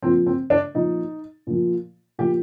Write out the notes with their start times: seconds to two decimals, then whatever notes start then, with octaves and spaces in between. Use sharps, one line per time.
0.02 A#2 F3 C4
0.26 C4
0.50 D4
0.74 A#2 F3 D#4
1.47 A#2 F3
2.19 A#2 F3 G4